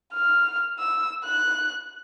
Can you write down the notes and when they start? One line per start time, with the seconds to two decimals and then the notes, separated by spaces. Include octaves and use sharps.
0.14 F6
0.79 E6
1.25 F#6